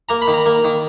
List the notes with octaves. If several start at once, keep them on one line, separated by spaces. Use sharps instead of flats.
A#3 A#5
B5
D#3
A#5
A#3
D#3